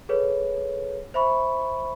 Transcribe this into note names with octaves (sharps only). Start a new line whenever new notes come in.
G#4 A4 B4 C#5
C5 E5 B5 C#6